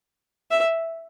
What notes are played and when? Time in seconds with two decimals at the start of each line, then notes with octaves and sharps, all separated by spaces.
0.51 E5